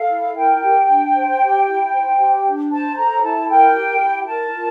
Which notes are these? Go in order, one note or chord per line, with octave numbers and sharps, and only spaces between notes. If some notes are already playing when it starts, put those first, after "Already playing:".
Already playing: A4 F5
E4
A#4 G5
G4
D4
C5
G4
E4
C5
G4
D4
C5 A5
A4 A#5
E4 A5
A#4 G5
G4
E4
A#4 A5
F4